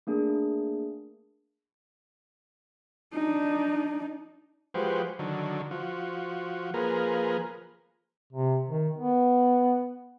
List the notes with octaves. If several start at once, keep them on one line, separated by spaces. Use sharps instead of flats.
A3 A#3 D4 G#4
D4 D#4
F3 G#3 F#4 G4 B4 C5
D3 D#3 F#3
F3 F#4
F3 A#3 G#4 A#4 B4
C3
D#3
B3